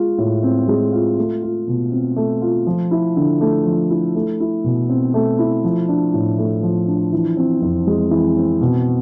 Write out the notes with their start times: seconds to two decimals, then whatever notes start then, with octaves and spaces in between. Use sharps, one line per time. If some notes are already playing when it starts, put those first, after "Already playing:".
Already playing: G#3 F4
0.18 A2
0.43 C4
0.68 G#3
0.92 F4
1.18 A3
1.42 F4
1.67 B2
1.92 C4
2.16 A3
2.42 F4
2.66 F3
2.91 E4
3.16 D3
3.41 A3
3.66 F3
3.90 E4
4.15 A3
4.40 E4
4.64 B2
4.89 C4
5.14 A3
5.39 E4
5.64 F3
5.88 D4
6.14 A2
6.38 A3
6.63 F3
6.87 D4
7.12 E3
7.37 C4
7.62 F2
7.87 G#3
8.11 E3
8.37 C4
8.61 B2